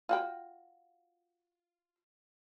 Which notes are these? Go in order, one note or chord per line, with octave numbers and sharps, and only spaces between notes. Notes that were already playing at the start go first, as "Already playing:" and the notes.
F4 F#4 G5